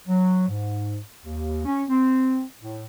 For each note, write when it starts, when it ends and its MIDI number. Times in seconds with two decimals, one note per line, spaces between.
0.08 0.47 54
0.48 0.99 44
1.25 1.61 39
1.65 1.83 61
1.88 2.43 60
2.61 2.85 45